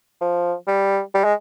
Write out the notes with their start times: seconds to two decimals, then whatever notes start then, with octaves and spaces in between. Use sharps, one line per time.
0.21 F3
0.67 G3
1.14 G3
1.24 G#3